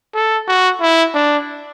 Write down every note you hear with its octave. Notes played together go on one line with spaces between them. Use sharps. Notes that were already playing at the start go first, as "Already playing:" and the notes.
A4
F#4
E4
D4